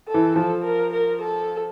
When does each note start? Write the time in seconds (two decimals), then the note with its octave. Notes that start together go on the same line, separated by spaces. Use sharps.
0.08 A4
0.14 E3
0.36 F3 A4
0.64 A#4
0.93 A#4
1.21 A4